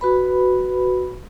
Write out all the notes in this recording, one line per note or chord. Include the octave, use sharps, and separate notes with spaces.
F#4 B4 B5